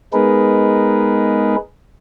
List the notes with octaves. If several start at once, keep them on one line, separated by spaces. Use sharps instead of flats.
G#3 B3 D#4 G#4 A#4 B4